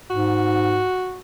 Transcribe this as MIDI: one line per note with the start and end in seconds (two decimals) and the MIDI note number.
0.10 0.85 44
0.10 1.21 66